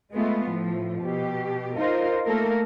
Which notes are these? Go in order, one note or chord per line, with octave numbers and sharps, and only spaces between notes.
G#3 A3 B3 F4
A2 F3
B2 G4
D#4 F4 A#4 C5
A3 A#3 A4 A#4